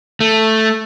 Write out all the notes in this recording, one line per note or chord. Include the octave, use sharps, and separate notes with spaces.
A3